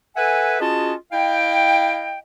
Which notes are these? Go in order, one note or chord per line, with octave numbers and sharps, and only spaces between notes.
A4 B4 E5 F#5 G#5
C#4 F4 F#4 G#4 D#5 A5
E4 D#5 F5 G5